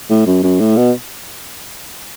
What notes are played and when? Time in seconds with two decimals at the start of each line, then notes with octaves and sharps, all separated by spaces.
0.10 A2
0.26 F#2
0.43 F#2
0.60 A2
0.76 B2